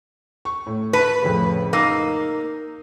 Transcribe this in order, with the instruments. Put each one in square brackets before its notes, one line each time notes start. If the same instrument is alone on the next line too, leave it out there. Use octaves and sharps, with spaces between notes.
[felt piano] C#6
A2
[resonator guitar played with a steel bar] B4 [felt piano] A5
[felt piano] F2 A2 C#3
[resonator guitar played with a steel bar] A#3 [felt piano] D#4 E6 D#7